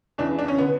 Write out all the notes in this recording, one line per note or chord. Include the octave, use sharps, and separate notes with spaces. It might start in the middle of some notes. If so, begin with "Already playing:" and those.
E2 C#3 E3 D4
D4
C#4
D3 B3